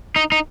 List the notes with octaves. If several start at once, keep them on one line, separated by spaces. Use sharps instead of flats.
D#4
D#4